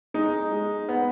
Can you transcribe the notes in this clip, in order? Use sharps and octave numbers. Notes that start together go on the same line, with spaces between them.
G#3 D#4
G#3
B3